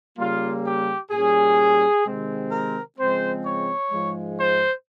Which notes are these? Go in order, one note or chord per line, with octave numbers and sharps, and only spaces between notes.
C#3 G3 A#3 F4
G4
A#2 G3 C#4 G#4
C3 D#3 G#3 C4
A#4
C#3 F3 G#3 C4 C5
C#5
G#2 F3 G#3
C5